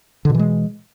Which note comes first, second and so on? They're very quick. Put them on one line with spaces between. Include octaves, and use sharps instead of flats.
D3 B2 E3 G#3